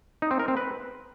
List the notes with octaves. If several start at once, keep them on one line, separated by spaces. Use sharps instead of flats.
D#4
C4
A#4
C4
B4